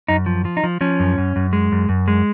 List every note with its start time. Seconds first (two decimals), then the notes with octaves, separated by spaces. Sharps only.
0.08 F#2 D#4
0.26 F3
0.45 F3
0.57 D#4
0.64 F3
0.81 F3 C#4
1.00 F#2
1.18 F#2
1.36 F#2
1.53 G#3
1.72 F#2
1.89 F#2
2.08 G#3